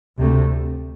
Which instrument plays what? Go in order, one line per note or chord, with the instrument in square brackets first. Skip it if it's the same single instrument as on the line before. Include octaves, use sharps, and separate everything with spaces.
[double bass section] D2 C3 A3